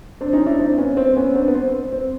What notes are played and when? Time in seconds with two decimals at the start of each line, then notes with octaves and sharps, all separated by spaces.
0.21 C4 D4
0.33 C#4 D#4
0.46 D4 E4
0.59 C4 D4
0.78 B3 C#4
0.97 C4
1.17 B3 C#4
1.35 C4 D4
1.48 B3
1.55 C4
1.92 C4